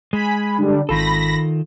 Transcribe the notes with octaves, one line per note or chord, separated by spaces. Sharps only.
G#3 G#5 B5
D3 G3 D4
G#1 D#3 F4 A4 B5 A#6